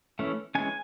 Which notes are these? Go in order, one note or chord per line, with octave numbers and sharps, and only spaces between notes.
E3 A3 C#4
E3 G#3 C#4 G#5